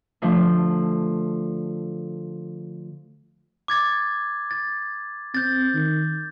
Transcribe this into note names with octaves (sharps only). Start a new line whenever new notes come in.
D3 F3 A3 D4
D6 G#6 A6
A6
C4 G6 A6
D#3